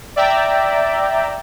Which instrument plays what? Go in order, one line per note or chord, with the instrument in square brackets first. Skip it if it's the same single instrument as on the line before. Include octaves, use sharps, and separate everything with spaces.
[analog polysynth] D5 E5 G5 A#5